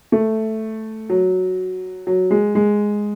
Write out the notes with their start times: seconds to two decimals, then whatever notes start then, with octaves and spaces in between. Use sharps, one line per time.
0.12 A3
1.09 F#3
2.07 F#3
2.31 G#3
2.55 G#3